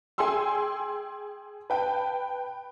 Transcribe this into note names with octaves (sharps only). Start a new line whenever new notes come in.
G#4 G5 G#5 C6 E6
B4 G5 A5